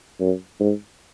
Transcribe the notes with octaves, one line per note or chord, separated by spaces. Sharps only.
F#2
G#2